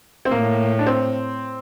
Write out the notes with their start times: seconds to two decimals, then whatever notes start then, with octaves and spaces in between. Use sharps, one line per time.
0.25 C4
0.31 A2 A#3
0.79 D4
0.87 C4